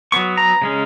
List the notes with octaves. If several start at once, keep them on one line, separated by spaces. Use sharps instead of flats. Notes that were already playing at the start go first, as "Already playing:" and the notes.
F#3 B3 C#6
A#5
C#3 G#3 C#4